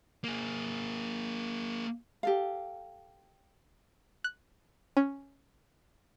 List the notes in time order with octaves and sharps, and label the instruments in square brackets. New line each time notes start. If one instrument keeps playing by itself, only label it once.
[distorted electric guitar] A#3 G#4
[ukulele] G4 A4 F5
[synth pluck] F#6
C#4